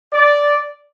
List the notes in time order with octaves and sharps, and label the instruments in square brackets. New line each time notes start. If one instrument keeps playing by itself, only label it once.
[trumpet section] D5